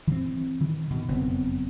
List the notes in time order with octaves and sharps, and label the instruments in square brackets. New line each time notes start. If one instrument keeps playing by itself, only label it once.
[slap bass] E3 C4
D#3 E3
B2 D#3
F#1 F2 B3 C4